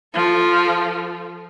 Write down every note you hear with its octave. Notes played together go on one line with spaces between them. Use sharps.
F3 A4